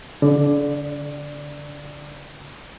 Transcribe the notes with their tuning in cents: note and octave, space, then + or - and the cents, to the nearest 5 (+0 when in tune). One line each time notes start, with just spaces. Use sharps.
D3 -40 D5 +5